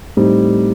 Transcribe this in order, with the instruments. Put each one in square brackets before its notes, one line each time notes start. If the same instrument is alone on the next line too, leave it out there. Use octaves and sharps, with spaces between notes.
[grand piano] A2 G3 C4 D#4